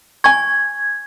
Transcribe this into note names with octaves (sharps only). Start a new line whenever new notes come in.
G#5 C#6 G#6